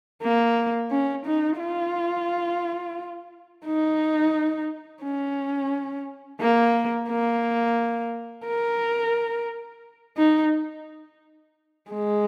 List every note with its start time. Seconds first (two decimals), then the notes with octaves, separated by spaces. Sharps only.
0.23 A#3
0.91 C#4
1.26 D#4
1.59 F4
3.65 D#4
5.03 C#4
6.41 A#3
7.09 A#3
8.47 A#4
10.18 D#4
11.90 G#3